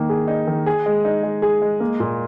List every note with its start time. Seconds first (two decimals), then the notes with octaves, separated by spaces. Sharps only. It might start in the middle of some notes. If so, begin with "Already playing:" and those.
Already playing: D#3 A#3
0.09 G#4
0.28 D#4
0.47 D#3
0.66 G#4
0.86 G#3
1.05 D#4
1.23 G#3
1.42 G#4
1.62 G#3
1.80 A#3
2.00 A#2